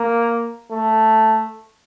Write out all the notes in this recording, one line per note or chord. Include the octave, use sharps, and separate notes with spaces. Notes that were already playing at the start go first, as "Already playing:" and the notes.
Already playing: A#3
A3